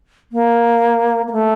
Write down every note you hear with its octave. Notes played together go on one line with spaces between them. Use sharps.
A#3
A#3
A3